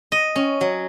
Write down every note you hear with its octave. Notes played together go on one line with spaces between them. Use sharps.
D#5
C#4
F#3